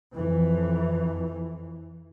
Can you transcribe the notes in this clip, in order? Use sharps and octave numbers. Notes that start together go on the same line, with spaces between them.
F2 E3